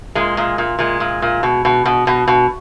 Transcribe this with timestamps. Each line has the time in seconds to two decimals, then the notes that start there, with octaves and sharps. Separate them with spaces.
0.15 A#2 G#3
0.37 A#2
0.58 A#2
0.79 A#2 G#3
1.00 A#2
1.22 A#2
1.43 B2
1.65 B2
1.85 B2
2.07 B2
2.28 B2